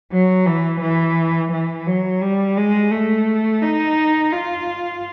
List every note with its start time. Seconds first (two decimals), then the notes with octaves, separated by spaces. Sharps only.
0.12 F#3
0.46 E3
0.81 E3
1.52 E3
1.87 F#3
2.21 G3
2.57 G#3
2.91 A3
3.62 D#4
4.32 F4